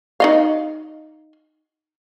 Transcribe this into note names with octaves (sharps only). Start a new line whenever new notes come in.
D#4 D#5 F5